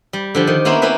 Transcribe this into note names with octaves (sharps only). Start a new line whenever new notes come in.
G3
D3 F3 G4
D#3
A#3 B3 C#4 E4 C5
A#3 C4 C#4 E4 B4